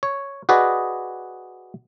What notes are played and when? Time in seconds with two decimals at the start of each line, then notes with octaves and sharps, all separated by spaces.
0.03 C#5
0.49 F#4 G#4 B4 D5 D#5